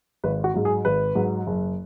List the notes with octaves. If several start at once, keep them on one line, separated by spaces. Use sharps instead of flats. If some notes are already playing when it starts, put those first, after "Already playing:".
G#1 B4
F#4
G#2 F#3
G#4
G#1 B4
G#2 F#3
F#1